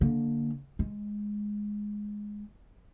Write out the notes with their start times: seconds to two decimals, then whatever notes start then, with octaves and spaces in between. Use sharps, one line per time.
0.01 D3 A#3
0.79 G#3